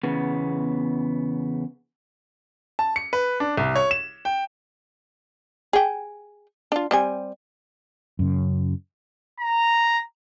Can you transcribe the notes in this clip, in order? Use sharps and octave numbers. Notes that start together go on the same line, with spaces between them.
E2 C#3 B3
A5
C#7
B4
D4
C2
C#5
E7
G5
G#4 G5
D4 F4
G3 C4 G#5
F#2 C#3
A#5